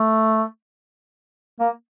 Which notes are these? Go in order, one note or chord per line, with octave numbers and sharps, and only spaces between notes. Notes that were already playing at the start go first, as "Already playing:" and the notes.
Already playing: A3
A#3